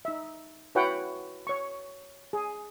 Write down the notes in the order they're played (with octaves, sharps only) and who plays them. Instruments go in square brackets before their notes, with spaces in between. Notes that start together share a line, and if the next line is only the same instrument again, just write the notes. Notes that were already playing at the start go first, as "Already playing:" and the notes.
[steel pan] D#4 E5
E4 F#4 B4 C#5 F#5 G5
C#5 C#6
G#4